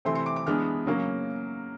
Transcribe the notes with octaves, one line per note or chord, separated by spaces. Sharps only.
C3 E3 A3 C4 C6
C6
D6
D6
E3 G#3 B3 D4 F6
C#3 F#3 A#3 C#4